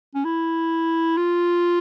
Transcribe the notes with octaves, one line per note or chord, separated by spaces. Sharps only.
C#4
E4
F4